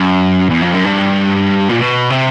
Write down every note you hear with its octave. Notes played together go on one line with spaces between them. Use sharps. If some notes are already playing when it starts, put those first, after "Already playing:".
Already playing: F#2
E2
F2
F#2
G2
A#2
B2
C3